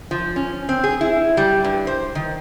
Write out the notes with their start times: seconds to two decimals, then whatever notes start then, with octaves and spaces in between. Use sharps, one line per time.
0.11 F3
0.36 C#4
0.69 C4
0.84 G#4
1.01 E4
1.37 G3
1.64 G2
1.87 C5
2.15 D#3